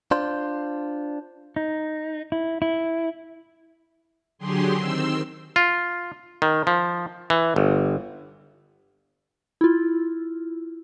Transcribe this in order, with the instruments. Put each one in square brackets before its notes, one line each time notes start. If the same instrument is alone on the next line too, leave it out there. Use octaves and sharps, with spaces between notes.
[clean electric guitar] D4 F4 C5
[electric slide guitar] D#4
E4
E4
[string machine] D3 F#3 G4 G#4 C6
D#3 C4 C6 E6
[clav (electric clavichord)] F4
D#3
F3
E3
G1
[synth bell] E4 F4